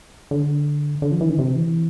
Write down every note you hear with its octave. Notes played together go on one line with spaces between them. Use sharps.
D3
D3
F3
E3
D3
C3
E3